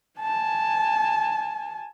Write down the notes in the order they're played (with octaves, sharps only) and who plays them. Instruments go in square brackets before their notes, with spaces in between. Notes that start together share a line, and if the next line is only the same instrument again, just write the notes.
[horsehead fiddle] G#5 A5